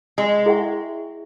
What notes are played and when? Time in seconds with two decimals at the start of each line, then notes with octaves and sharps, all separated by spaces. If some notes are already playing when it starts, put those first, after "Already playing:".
0.18 G#3
0.46 E4 G#4 E5 G5 C#6